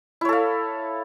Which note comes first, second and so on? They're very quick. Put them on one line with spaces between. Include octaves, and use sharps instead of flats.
E4 C#5 A4 F5